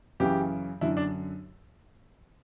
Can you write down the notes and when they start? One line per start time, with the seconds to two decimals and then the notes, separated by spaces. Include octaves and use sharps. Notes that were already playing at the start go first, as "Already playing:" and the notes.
0.20 F#2 C#3 E3 G4
0.81 F#2 D3 E4
0.97 D4